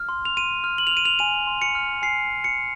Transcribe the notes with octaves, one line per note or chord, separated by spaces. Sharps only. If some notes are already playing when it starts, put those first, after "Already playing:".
Already playing: F6
C6
F7
C6 D#7
F6
F#7
F7
F6
D#7
F7
G#5 D#7
C6
C#7
F6
G#5 C7
G#5
C#7
C6